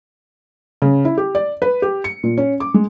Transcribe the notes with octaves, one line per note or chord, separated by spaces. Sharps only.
C#3
E4
G4
D5
B4
G4
C#7
A#2
C#4
D6
G#3